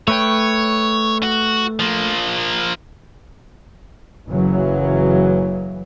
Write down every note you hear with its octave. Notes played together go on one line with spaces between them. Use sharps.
A3 B4 C#5 G5
F#4
F3 A#3
F#1 C#3 E3 F#3